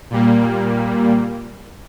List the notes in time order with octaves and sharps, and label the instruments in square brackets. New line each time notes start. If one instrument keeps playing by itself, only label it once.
[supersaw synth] A#2 G3 A#3